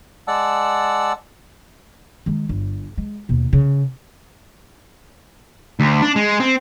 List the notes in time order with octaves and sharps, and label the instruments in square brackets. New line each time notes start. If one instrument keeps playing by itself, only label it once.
[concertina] G#3 D5 F#5 A5 E6
[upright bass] D#3 G#3
G1
G#3
D#2 B2
C#3
[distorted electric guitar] D2
D4
G#3
C4